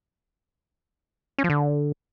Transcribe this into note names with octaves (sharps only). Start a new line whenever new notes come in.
C#4
F3
D3